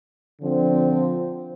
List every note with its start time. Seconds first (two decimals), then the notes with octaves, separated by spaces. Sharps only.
0.42 D3 F3 C4